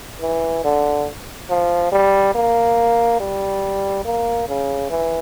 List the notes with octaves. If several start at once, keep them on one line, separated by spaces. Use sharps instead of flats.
E3
D3
F3
G3
A#3
G3
A#3
C#3
E3